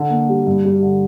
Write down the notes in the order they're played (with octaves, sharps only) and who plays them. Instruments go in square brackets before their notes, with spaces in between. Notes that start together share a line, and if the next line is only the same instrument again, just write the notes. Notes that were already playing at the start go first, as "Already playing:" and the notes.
Already playing: [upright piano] D3
A#3
G3
G2
G3
D3